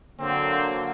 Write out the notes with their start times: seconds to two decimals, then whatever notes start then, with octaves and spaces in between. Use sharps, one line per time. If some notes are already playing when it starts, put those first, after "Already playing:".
0.19 D3 F#3 A#3 C4